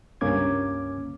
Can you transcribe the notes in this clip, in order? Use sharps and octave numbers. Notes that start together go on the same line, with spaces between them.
C#2 G2 A#3 C#4 D6 G#6